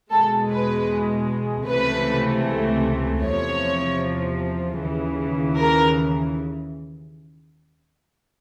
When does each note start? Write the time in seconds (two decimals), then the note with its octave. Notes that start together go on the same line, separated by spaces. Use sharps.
0.12 E2 B2 G#3 A4
0.51 B4
1.68 C#2 C3 E3 A3 B4
3.24 E2 C3 F3 C#5
4.81 D#2 C#3 E3
5.59 A#4